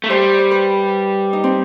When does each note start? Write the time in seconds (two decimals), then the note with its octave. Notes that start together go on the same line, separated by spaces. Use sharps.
0.04 A3
0.09 G3 C5
0.39 C5
0.51 B4
1.33 D#4
1.44 C4